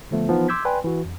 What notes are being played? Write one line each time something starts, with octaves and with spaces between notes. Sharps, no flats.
D3 F3 A3 B3
E3 F3 B3 D#4
C6 D6 E6 G6 G#6 B6
B4 D5 G5 G#5 C6
E3 F#4
F2